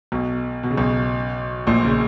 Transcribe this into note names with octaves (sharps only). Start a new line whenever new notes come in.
B1 B2
B2
C#3
B1 B2
A#1 A#2
C#3